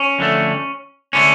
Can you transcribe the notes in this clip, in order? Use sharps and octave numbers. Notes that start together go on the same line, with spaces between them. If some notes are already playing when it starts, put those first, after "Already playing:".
Already playing: C#4
F2 D3 A3
D3 A3 C#4